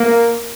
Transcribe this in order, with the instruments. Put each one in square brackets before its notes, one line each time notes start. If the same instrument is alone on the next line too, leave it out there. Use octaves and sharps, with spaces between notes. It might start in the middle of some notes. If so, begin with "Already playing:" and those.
Already playing: [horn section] A#3